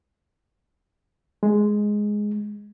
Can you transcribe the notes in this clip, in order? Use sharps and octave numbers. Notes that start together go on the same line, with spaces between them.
G#3